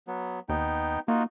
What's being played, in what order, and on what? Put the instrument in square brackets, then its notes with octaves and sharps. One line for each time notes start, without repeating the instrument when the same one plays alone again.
[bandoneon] F#3 B3
[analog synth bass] D#2 [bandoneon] B3 D#4 G5
[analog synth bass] A#3 [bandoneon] D#4 F4 F#4